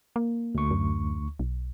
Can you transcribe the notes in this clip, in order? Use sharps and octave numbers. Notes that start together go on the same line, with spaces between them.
A#3
D2 C#6
F#2
B1